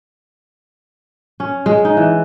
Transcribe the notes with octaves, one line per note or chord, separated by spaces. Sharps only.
C#4
G#3
D#4
E3